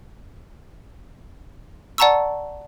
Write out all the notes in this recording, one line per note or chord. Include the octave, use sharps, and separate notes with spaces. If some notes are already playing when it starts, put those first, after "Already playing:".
D5 F#5 A5 A#5 C#6 E6